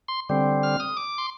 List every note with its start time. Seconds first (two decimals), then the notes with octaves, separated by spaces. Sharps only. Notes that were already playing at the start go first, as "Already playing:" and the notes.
0.08 C6
0.29 D3 G3 C4
0.63 F6
0.80 D#6
0.97 D6
1.18 C6